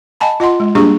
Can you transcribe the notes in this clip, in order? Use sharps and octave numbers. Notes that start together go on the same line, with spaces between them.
D#5 F#5 G#5 A5 B5
F4 D#5 F#5 C6
G#3
G3 A#3 D4 G4 G#4 C#6